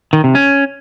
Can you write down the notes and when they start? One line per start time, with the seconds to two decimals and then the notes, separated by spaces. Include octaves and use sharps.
0.13 D#3
0.24 C3
0.35 C#4